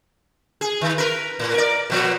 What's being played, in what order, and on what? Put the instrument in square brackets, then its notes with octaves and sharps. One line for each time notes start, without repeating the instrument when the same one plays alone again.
[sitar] G#4
D#3
A#4 B4
A2
A#4 D5
B2 F3 B3